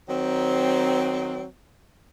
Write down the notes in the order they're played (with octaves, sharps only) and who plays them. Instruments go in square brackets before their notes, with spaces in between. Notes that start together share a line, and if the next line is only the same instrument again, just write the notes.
[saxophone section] D#3 F#3 C4